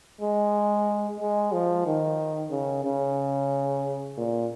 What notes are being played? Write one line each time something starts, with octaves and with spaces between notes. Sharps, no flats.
G#3
G#3
F3
D#3
C#3
C#3
A#2